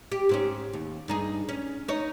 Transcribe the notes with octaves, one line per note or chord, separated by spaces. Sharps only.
G4
G#2 C4 C#4
D#2
G2 D#4 G#4
C#4
D#4 C#5